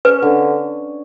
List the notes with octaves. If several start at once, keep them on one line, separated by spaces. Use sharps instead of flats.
C#4 B4
D3